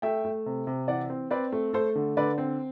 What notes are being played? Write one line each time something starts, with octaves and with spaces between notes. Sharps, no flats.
A3 E5 G5
A3
C3
C3
E3 D5 F#5
C4
C4 B4 D5
A3
A3 A4 C5
D3
D3 B4 D5
C4